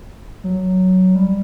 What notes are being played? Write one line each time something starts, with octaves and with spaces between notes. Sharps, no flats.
F#3
G3